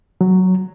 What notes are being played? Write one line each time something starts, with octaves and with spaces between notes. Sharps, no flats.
F#3